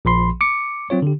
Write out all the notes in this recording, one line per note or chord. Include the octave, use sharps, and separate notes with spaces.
A#1 F3 B5 C6
D6 C#7
F#3 C4 F4 C#5
D3 G4